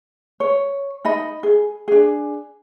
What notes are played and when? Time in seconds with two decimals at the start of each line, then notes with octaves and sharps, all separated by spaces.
0.40 C#5
1.05 D#4 D#5 B5
1.43 G#4
1.88 D4 G#4